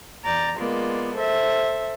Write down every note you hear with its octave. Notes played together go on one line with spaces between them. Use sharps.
E2 D5 A#5 G6 A6
G#3 A#3 B3 F4 D5
A4 C5 E5